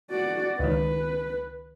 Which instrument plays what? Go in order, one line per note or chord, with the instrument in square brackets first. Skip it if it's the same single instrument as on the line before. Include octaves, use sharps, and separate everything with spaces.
[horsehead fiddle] F#4 D5
[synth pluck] C#2 D#3 [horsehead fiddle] B4